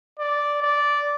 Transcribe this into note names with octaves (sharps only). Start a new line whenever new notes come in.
D5
D5